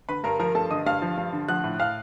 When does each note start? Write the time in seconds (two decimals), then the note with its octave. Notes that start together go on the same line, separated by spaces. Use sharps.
0.09 D3 B4 B5
0.24 G2 A#4 A#5
0.39 F3 A#4 A#5
0.55 G2 A4 A5
0.71 D3 D#5 D#6
0.86 G2 F5 F6
1.02 F3
1.17 G2
1.33 D3
1.48 F3 F#5 F#6
1.64 A2
1.79 A2 F5 F6